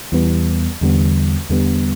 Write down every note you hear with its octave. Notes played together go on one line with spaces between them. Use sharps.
E2 E3 G3 B3
E2 D3 G3 B3
E2 D3 G3 B3